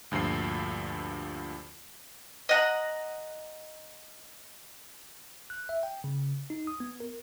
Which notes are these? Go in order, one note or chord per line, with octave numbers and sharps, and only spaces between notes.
D2 G2 A#2 F3 C7
D#5 F#5 A#5
F#6
E5
G5
C#3
D#4
D#6
B3
A#4